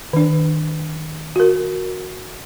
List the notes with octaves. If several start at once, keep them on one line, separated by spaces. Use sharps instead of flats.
D#3 D4
F#4 A#4